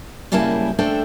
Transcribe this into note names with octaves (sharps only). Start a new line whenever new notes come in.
F#2 C#3 G3 A#3 E4 A5
A3 D4 A4 C5 G5